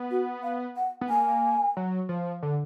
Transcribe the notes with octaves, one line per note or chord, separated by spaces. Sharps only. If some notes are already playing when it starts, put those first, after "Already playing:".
Already playing: B3
F#4
F5
F#5
B3
A#3 G#5
F#3
F3
D3